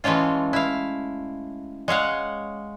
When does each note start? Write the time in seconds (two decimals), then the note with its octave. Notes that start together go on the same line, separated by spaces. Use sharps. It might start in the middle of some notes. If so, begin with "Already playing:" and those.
0.04 E3 G#3 A3 C#4 F4
0.53 E4 F5
1.88 G#3 C#5 F5 F#5